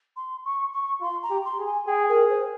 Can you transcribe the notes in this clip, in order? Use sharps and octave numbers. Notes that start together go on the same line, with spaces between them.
C6
C#6
C#6
F4 C6
A#5
G4
C6
G#4
G#5
G#4 G5
A#4
C5